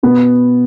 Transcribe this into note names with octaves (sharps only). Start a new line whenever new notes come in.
B2 B3